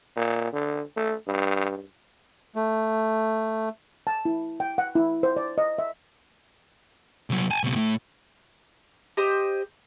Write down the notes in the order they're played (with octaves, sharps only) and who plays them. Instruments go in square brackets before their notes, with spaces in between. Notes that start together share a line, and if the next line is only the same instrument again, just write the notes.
[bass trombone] A#2
D3
A3
G2
[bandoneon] A3
[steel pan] A5
E4
G5
F#5
E4
C5
D5
D#5
E5
[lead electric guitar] C2 F#3
G#5 A5
C#2 B2
A2
[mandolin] G4 C5 D#5